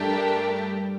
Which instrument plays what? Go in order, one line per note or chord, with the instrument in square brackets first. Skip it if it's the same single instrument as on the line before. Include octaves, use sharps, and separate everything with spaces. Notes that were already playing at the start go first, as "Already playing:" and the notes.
Already playing: [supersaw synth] G2 G3 [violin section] A3 D4 G4 A#4